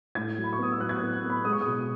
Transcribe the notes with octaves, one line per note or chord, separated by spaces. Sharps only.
A2 G#6
F#3
B5
C#6
B3 D#6
E6
F#3 F#6
G#6
F#6
B3
F#6
B3
B5
G#3 D#6
C#6
D#6
B2